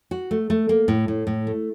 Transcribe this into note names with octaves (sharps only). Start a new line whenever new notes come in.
F#4
A3
A3
A#3
A2
A2
A2
A3